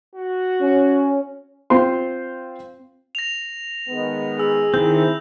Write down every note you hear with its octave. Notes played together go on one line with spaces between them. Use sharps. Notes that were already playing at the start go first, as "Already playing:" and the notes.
F#4
C#4
C4 F4 C5 C6
A#6 F7
D#3 G#3 B3
G#4 E6
D#3 C4 E4 G6